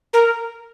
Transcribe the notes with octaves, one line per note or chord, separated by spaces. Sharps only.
A#4